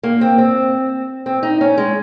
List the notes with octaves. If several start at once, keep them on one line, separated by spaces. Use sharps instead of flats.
A#3
C4
C4
C4
D#4
C#4
G#3